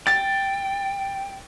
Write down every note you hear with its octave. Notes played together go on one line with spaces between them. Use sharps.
G5 A6